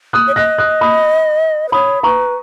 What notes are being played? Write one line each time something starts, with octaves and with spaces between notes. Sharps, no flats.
D#6 F#6
C#5
D#5 F#6 A#6
D#6 F#6
B5 D#6
B4
C#5 B5 D#6
B4 A#5 C#6